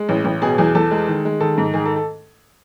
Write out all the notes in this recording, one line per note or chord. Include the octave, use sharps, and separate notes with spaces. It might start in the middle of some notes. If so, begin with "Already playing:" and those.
Already playing: G#3
A1
A1
B2 G#4
E2 G#4
E2 A4
G#3
D#3
G#3
D#3 A4
G#2
D#3 G#4
A4
A4